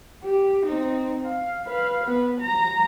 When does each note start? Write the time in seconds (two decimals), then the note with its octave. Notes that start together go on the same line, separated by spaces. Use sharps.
0.24 G4
0.66 C4 D#4
1.26 F5
1.66 B4 F5
2.03 B3 B4
2.40 A#5